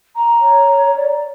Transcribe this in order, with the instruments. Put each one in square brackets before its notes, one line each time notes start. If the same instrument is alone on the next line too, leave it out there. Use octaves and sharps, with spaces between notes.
[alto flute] A#5
[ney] C#5
[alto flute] D5